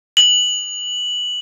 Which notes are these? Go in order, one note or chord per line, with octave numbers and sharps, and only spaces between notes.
F#7